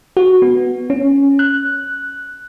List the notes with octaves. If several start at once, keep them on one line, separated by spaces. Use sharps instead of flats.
F#4
B3
C#4
F#6